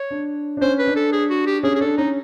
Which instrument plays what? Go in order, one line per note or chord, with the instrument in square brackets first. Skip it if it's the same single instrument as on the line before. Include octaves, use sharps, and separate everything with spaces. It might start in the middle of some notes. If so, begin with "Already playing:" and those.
Already playing: [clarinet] C#5
[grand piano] D4
D4
[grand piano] C#4 [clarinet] C5
[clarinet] B4
[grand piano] D4
[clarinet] A4
G#4
F#4
G4
[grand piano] C#4 [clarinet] G#4
[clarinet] G#4
[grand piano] D4 [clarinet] A4
[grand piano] C#4 [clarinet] D#4